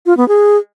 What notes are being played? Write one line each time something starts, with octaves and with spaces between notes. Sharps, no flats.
F4
B3
G#4